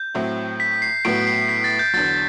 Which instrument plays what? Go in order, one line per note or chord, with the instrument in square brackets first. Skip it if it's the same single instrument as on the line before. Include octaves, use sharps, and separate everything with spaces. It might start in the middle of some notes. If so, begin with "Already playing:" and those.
Already playing: [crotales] G6
[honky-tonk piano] A2 F#3 C4 E4
[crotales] B6
C7
[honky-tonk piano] A2 F#3 B3 F#4 [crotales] D7
[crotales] C7
B6
A6
G6
[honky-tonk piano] E2 D3 F#3 [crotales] A6